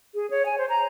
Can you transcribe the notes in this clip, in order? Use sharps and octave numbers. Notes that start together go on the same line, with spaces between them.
G#4
C#5
G#5
C5
A#5